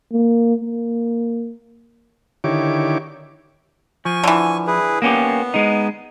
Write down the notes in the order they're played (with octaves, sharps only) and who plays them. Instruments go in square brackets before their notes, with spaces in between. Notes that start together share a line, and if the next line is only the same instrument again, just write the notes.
[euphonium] A#3
A#3
[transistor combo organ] D3 D#3 E4 G4 C#5 D6
[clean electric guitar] F3 [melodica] G#5 C#6
[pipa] D3 E3
[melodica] E4 G#4 B4
[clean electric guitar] A#3 C#4 G4 [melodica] B3
[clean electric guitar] G#3 D#4